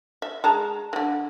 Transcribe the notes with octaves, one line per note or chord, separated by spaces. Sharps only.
E5
G#3 A5 A#5
D3 E3